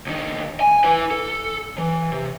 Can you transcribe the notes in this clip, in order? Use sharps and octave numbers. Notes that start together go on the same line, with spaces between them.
C#2 D#3
G#5
E4 B4
A4
E3
C3